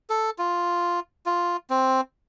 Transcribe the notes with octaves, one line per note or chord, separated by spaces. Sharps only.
A4
F4
F4
C4